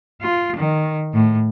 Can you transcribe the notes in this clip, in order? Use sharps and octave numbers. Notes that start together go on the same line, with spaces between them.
F4
D#3
A2